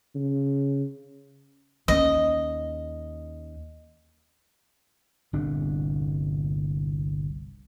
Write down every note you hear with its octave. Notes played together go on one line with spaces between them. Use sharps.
C#3
D#2 C#4 D#5
G1 C2 A#2 D4